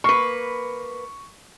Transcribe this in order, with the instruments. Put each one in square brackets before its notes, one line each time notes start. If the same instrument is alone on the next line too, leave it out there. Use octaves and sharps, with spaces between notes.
[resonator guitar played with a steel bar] A#3 B4 [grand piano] C#6